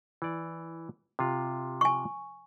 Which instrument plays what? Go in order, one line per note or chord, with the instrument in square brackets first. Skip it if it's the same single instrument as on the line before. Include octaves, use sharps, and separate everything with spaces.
[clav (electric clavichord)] E3 D5
C3 F4
[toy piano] G#5 C#6